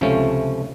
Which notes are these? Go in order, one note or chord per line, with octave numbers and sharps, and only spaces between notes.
C#2 C3 F3 A3 C#4